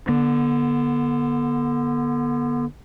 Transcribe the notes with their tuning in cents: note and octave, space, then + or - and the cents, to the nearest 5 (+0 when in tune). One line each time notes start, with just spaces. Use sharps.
D3 +0 B3 -35